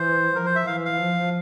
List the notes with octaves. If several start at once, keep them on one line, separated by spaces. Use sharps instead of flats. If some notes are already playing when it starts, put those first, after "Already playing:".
Already playing: E3 C5
F3 A#4
C5
E5
E3 F5
F5
F3